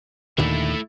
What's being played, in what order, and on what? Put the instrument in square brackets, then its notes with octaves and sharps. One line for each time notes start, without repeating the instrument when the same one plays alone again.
[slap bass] D#2 A#2 D3 [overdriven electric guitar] A3 E4